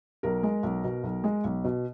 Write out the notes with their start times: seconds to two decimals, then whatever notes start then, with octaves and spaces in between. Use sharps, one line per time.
0.23 B1 A#4
0.43 G#3
0.63 B1
0.84 B2
1.03 B1
1.24 G#3
1.44 B1
1.64 B2